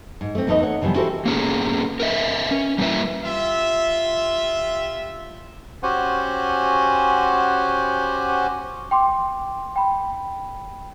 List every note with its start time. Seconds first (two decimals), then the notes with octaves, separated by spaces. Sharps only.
0.21 G#2
0.35 A3 C4
0.47 E2 A3 D#4 B4 D#5
0.63 C#5 F#5
0.81 C#3 E3 F3 G3 B3
0.95 E4 F#4 G4 A4 A#4 C5
1.25 A#3 B3 C#4 G#4 A4
2.00 A#4 B4 D#5 E5
2.51 C#4
2.78 G3 A#3 E4 F4 B4 E5
3.24 F4 G4 E5
5.83 C#4 F#4 G4 C5 F#5 G#5
8.91 G5 C6 D6
9.76 G5 B5